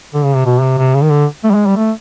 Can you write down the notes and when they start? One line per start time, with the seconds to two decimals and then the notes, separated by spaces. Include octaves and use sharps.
0.14 D3
0.25 C#3
0.35 C3
0.46 B2
0.61 C3
0.78 C3
0.95 C#3
1.03 D#3
1.11 D3
1.44 A3
1.50 G3
1.55 G#3
1.66 G3
1.77 A3